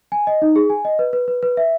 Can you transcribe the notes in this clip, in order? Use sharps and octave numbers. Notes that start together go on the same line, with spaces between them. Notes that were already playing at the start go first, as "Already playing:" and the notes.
G#5
D#5
D#4
G#4
G#5
D#5
B4
B4
B4
B4
E5